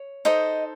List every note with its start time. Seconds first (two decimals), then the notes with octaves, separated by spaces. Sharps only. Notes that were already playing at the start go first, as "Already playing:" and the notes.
Already playing: C#5
0.25 D#4 A4 C5 D#5